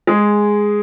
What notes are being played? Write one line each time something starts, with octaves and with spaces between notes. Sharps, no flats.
G#3 G#4